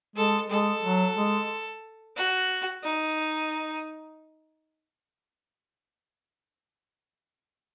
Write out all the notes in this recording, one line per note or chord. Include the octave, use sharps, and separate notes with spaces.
G#3 A4
G#3 A4
F#3
G#3
F#4
D#4